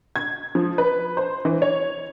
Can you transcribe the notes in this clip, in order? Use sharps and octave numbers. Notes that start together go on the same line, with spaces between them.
G#6
F3
B4
C5
E3
C#5